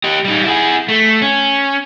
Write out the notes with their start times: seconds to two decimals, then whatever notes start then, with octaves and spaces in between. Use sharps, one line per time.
0.04 G4 D#5
0.24 G3 D#4
0.44 E4 G#4
0.88 A3
1.22 C#4